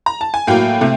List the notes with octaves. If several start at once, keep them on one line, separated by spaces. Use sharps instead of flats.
A#5
A5
G#5
A2 F#3 A#3 F5 G5
C3 A3